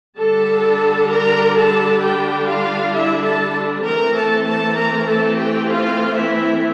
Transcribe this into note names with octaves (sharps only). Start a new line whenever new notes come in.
D3 G3 D4 A4 A5
A#4 A#5
A4 A5
G4 G5
F4 F5
E4 E5
A4 A5
E3 A3 C4 A#4 A#5
A4 A5
A4 A5
A#4 A#5
A4 A5
G4 G5
F4 F5
E4 E5